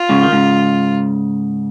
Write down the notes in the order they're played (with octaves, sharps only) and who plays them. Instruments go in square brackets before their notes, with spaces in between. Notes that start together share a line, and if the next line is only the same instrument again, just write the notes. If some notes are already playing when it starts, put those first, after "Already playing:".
Already playing: [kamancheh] F4
[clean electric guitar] G#2 C#3
D#3
G#2 C#3